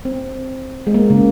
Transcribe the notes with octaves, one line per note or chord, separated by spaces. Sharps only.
C4
G#3
A#3
C#3